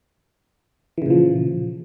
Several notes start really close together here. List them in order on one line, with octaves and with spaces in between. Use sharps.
E3 C#3 A#2 F3